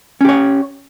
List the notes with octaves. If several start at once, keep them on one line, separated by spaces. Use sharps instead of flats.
C#4 G4 C#5